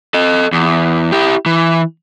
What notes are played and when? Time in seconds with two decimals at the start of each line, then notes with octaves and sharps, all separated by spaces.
0.14 A4 D#5
0.52 E2
1.12 E4 G4
1.46 E3